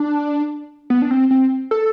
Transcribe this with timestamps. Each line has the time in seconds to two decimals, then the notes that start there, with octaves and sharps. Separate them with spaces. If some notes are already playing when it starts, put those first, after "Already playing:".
Already playing: D4
0.90 B3
1.02 D4
1.11 C4
1.31 C4
1.71 A4